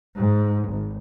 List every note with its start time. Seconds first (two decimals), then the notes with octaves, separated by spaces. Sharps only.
0.17 G#2
0.69 G#1